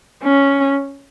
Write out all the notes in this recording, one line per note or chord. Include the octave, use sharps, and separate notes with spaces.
C#4